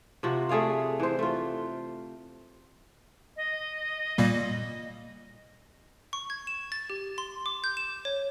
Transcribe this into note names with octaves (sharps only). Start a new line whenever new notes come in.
C3 F3 F#4
A3 G#4 D5 F5
E3 C5
A3 F4
D#5
A#2 G3 A#3
C#6
G#6
E7
A6
G4
C6
D6
G6
E7
C#5